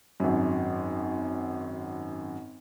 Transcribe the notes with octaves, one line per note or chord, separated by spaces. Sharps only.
G#1 F#2